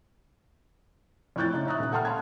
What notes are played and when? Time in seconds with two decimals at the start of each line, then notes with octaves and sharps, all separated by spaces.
1.36 F2 A2 C#6 F#6 G6 A6
1.53 C#3 D#4 E5
1.67 E5 A#5 C#6 D#6 F#6
1.79 D#1
1.92 A4 F#5 G5 A5 C6 F6
2.05 F5 G5 A5 B5 G#6